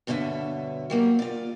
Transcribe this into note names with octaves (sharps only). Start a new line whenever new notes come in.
G2 B2 D3 C#4 E5
F#3 G3 A#3
F4 D5